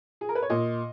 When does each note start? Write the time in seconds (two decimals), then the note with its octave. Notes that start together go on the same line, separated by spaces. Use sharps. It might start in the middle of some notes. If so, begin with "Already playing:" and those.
0.21 G#4
0.29 A#4
0.35 B4
0.42 C#5
0.50 A#2 D#5